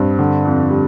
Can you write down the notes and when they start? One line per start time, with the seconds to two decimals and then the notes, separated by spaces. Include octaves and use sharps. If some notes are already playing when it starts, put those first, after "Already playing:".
Already playing: G2 C4
0.19 D3
0.45 F2
0.70 G3